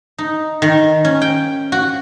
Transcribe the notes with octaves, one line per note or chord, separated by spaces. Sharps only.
D#4
D#3
C#4
G5
F#4